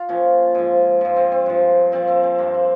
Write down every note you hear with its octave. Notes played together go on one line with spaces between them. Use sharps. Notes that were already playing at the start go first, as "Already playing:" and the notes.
Already playing: F4
A#2 F3 C#4
G#2 F3
G#2 F3
C4
C4
G2 F3
A#2 F3 C4
C4
C4
G2 F3 A#3
C4